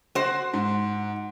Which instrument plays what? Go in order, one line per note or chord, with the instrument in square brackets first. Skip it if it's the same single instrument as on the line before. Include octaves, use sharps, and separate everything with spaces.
[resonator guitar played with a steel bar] F#4 C5
[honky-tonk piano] G#2